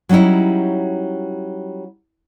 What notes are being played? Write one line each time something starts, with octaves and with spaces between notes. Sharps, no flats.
F#3 G3 C#4 D#4 E4